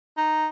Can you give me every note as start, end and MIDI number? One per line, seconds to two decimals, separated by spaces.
0.17 0.46 63